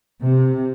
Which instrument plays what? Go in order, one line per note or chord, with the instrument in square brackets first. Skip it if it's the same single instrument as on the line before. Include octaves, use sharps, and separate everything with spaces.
[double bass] C3